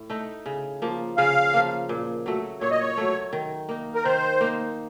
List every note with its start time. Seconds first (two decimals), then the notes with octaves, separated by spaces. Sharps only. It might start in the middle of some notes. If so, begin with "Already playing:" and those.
Already playing: A2
0.10 A3 D#4
0.46 C#3
0.82 F3 A#3
1.17 C#3 F5
1.54 F3 A#3
1.89 A#2
2.26 F#3 A3
2.61 A#2 C#5
2.71 D#5
2.80 C#5
2.97 F#3 A3
3.33 D#3
3.69 A#3 D#4
3.95 A#4
4.05 D#3 C5
4.41 A#3 D#4